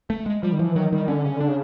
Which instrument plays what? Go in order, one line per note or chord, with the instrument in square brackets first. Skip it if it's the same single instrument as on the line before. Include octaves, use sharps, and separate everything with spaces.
[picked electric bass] A3
G#3
[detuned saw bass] F3 [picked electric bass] G3
[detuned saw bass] D#3
[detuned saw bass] E3 [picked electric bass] F3
[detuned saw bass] D#3 [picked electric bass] F#3
[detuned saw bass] D#3 [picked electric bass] G3
[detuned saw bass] D3 [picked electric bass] C#4
[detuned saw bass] C#3 [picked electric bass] C#4
[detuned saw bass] D3 [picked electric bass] D4
[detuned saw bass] C#3